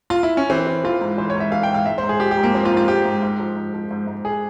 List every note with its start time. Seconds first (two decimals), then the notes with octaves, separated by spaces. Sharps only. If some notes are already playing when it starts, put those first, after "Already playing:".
0.10 F4
0.23 E4
0.37 C#4
0.50 E3 C4
0.67 E3
0.84 E3 F4
1.01 G#2
1.18 E3 C5
1.30 C#5
1.35 G#2
1.40 E5
1.52 E3 F5
1.63 G5
1.69 G#2
1.74 F5
1.86 G#2 E5
1.98 C5
2.03 G#2
2.09 G#4
2.20 F3 G4
2.31 G4
2.37 G#2
2.43 A#3
2.54 F3 C4
2.65 F4
2.72 G#2
2.77 F4
2.88 G#2 G4
3.05 G#2
3.23 G#2
3.40 F3
3.56 G#2
3.74 F3
3.91 G#2
4.07 G#2
4.25 G#4